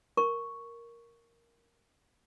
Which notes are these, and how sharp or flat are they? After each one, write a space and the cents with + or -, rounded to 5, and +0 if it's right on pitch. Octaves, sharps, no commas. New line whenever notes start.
A#4 +0 C#6 +0